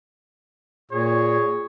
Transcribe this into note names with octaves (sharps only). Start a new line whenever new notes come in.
A#2 G#4 C#5